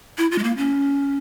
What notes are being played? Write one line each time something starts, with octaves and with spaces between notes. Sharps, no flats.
E4
F4
G#3
A#3
C#4